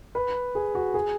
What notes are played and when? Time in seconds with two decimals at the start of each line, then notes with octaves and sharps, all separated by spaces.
0.15 B4
0.55 G#4
0.75 F#4
0.94 G#4